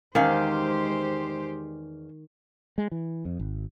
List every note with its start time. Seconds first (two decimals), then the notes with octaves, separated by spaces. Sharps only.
0.15 E2 D#3 G#3 C#4 G4 C5 F5
2.78 G#3
2.91 E3
3.25 F2
3.39 G#1